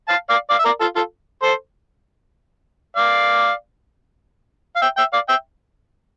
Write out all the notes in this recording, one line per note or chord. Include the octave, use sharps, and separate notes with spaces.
F5 A5
D5 F5
D5 F5
E5
A#4 D5
F4 A4
F4 A4
A4 C5
D5 F5
F5
E5 G5
E5 G5
D5 F5
E5 G5